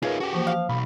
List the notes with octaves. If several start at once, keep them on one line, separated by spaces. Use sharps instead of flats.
D#4 F4 G#4 A#4 B4 C#5
C#4 F#4 G4
E3 F3 A#3
F5
B1 B5